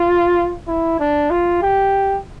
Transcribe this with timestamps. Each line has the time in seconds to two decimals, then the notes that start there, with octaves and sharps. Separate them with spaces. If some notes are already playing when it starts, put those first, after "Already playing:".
Already playing: F4
0.68 E4
0.99 D4
1.30 F4
1.62 G4